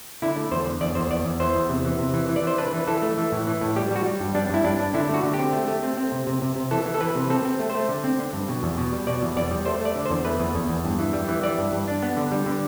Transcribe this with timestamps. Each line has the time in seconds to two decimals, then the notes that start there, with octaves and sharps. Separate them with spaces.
0.22 D3 E4
0.37 A3
0.52 E2 C5
0.67 D3
0.81 E2 D5
0.95 E2 C5
1.11 E2 D5
1.25 E2
1.40 E3 C5
1.55 E2
1.69 C3
1.85 E3
1.99 C3
2.14 E3
2.29 E3
2.36 D5
2.43 E3 C5
2.58 D4 B4
2.73 E3
2.87 E3 A4
3.02 A3
3.18 E3
3.32 A2
3.47 E3
3.61 A2
3.76 G3 G4
3.91 G3 F#4
4.06 G3
4.20 G2
4.35 G3 D4
4.50 G2 E4
4.64 G2 D4
4.80 D4
4.94 D3 E4
5.09 A3
5.14 F#4
5.23 D3
5.33 C4 G4
5.53 A3
5.68 A3
5.83 C4
5.97 C4
6.12 C3
6.27 C3
6.42 C3
6.56 C3
6.71 E3 A4
6.86 E3
6.94 A4
7.01 E3 B4
7.15 C3
7.30 C4 A4
7.45 C4
7.59 A3
7.70 C5
7.75 A3
7.89 D3
8.04 C4
8.19 D3
8.33 G2
8.48 B2
8.63 E2
8.77 B2
8.92 G3
9.07 B2 D5
9.22 E2
9.36 E2 D5
9.51 G3
9.66 A3 C5
9.81 A3 D5
9.96 D3
10.06 C5
10.10 E2
10.25 A3 B4
10.40 E2
10.55 E2
10.69 E2
10.85 G2
10.99 E3
11.13 G3
11.28 E3
11.43 E3 D5
11.58 G2
11.72 G2
11.88 D4
12.03 B3
12.17 D3
12.32 G3
12.46 D3